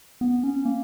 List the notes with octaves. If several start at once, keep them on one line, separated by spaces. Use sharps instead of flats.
B3
C#4
A#3